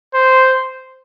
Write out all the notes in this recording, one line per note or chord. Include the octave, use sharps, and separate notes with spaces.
C5